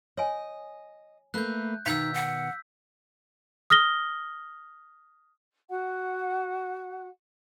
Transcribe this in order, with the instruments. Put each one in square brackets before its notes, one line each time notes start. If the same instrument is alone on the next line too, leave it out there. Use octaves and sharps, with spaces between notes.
[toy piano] C#5 G#5 [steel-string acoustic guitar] D#5
[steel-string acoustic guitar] A3 A#3 B4 [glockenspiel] F#6 G6
[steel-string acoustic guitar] B2 D#3 [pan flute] D#4 [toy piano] F5 [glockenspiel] E6 G6 B6
[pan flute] F#5
[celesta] D#6 F6 A#6 G7
[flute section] F#4 F#5